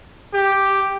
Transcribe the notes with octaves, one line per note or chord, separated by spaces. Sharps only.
G4